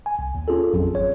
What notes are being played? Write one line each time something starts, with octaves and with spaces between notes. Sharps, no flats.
G#5
C2
D#2
C#4 F4 G#4 A4
A1 F2 F#3
G#1 C#5